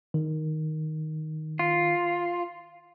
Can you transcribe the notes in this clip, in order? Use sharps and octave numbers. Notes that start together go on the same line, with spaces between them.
D#3
F4